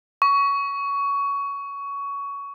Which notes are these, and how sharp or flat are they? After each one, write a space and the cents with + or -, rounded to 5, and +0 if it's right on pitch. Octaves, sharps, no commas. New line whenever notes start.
C#6 +20